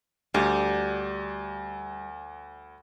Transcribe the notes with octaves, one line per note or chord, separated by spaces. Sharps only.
D2 G3